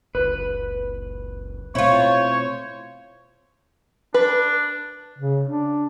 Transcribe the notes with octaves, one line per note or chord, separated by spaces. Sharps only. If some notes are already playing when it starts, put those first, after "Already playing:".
F#1 C#2 B4
B2 A3 C4 E4 F4 C5 C#5
D4 B4
C#3
D4